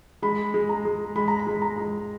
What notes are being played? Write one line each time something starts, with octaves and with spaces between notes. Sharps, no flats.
G#3 B5
G#3
A#5
G#3
G#3 B5
A#5
B5
G#3
A#5
G#3